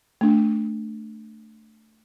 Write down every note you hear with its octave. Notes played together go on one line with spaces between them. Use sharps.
A3 D4